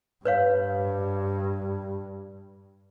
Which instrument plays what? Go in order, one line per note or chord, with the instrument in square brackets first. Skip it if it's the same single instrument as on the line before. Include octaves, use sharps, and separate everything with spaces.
[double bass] G2 [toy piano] B4 C#5 F5